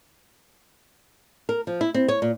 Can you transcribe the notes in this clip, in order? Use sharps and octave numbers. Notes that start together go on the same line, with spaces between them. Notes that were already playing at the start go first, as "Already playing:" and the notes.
A#4
F3
E4
C4
C#5
A#2